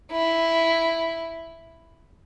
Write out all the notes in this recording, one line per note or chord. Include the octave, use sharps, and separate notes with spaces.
E4